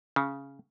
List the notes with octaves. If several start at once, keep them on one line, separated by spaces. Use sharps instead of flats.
C#3